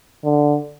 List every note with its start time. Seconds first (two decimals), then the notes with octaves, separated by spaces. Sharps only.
0.25 D3